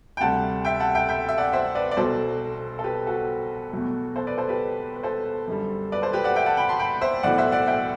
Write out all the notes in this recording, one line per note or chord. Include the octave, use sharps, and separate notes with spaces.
G5
D2 C3 G3 F#5 A5
E5 G5
F#5 A5
E5 G5
E5 G5
E5
D5 F#5
C5 E5
B4 D5
D5
B1 B2 F#3 A4 C5
A4
G4 B4
F#4 A4
E2 B2 F#3 A3
A4 C5
B4 D5
A4 C5
G4 B4
B4
A4 C5
F#2 D3 G3
B4 D5
A4 C5
G4 B4
D5 F#5
E5 G5
F#5 A5
G5 B5
A5 C6
G5 B5
C5 E5
B1 A2 E3 D5 F#5
C5 E5
D5 F#5
E5 G5